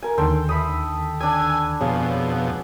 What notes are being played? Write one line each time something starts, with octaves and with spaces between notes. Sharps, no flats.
A#4 G#5
D#2 D3 D#3 A4 G5 C6
E5 B5 D#6
D4 G#5 E6
F2 B2 G#4 C#5 F5
F#5